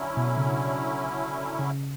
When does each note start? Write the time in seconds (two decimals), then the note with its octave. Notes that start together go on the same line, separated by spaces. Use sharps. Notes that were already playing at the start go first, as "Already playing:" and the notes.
Already playing: D3 F#3 C#4 E4
0.17 B2
0.37 C#3
1.59 C#3